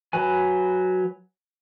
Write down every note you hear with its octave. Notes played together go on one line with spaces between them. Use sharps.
F#3 B4 G#5